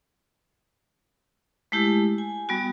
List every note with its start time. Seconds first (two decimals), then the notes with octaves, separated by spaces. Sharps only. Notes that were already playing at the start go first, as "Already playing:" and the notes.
1.72 G#3 A3 E4 G4
2.18 G#5
2.49 G3 B3 F#4